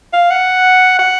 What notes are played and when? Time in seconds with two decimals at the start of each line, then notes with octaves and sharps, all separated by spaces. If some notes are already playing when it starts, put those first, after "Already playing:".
0.13 F5
0.30 F#5
0.99 F#5